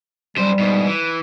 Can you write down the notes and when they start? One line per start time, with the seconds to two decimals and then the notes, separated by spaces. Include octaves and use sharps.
0.37 F#2 G3 C5
0.59 G#2 B2
0.86 E3